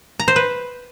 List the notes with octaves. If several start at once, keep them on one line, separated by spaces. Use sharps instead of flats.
A#5
C5
B4